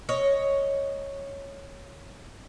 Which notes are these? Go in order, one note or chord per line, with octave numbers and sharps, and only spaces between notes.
C#5 D#5